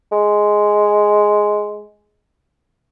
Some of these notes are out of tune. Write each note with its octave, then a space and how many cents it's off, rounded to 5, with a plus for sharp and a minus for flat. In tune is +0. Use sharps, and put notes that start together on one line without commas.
G#3 +5